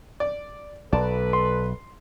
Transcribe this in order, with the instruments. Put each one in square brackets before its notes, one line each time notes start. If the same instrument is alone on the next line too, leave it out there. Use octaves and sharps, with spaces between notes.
[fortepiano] D5
[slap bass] B1 B2 [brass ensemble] A4 B4 [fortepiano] D5 A5
[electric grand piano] C6